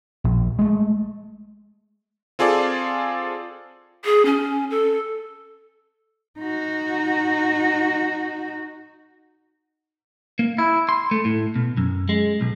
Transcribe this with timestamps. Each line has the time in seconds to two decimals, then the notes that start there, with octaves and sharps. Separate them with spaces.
0.24 A#1
0.59 G#3 A3
2.39 C4 F4 G#4 A4 D5
4.05 G#4
4.26 C#4
4.70 A4
6.39 D#4 F#4
10.39 A#3
10.58 E4
10.89 C6
11.11 A3
11.25 A2
11.56 B2
11.77 F#2
12.09 G#3
12.41 B1